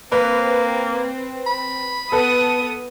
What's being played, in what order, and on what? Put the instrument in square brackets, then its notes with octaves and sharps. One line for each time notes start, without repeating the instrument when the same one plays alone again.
[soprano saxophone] A#3 [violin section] C4 [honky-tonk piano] B4
[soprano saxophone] B5
[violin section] B3 D#6 [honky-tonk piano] A4 B4